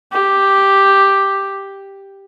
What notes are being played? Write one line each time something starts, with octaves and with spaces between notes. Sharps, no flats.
G4